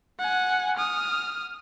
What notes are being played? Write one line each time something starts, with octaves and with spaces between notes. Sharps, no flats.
F#5 G#5
D#6 F6